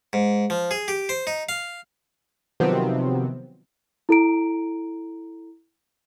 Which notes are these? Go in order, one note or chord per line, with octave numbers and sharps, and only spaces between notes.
G#2
F3
G#4
G4
C5
D#4
F5
C3 D#3 F3 F#3 B3 C4
E4 A4 A#5 D7